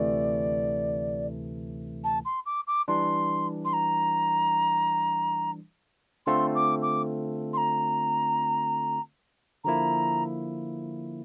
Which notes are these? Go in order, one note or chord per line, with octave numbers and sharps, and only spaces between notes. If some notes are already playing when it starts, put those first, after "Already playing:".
Already playing: D2 C3 E3 A3 D5
A5
C6
D6
D6
E3 G3 D4 C6
C6
A#5
D3 A3 C4 F4 A4 C6
D6
D6
C6
A#5
D3 F3 A#3 E4 A#5